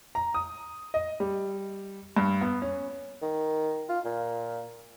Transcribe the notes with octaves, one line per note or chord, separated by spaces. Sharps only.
A#5
D#6
D#5
G3
G2
B3
C#4
D#3
F4
A#2